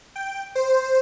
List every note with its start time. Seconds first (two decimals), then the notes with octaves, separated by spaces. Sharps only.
0.16 G5
0.55 C5